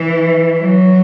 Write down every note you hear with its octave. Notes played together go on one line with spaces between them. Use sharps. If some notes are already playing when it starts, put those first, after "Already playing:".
Already playing: E3
F#3